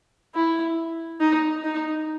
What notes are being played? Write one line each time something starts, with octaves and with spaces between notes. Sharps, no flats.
E4
D#4
D#4